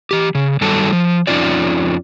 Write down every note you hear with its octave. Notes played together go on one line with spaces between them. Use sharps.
E3 G4
C#3
G2 D#3 F#3 G3 A4 A5
F3
F2 D3 C#4 D#4 F4 D5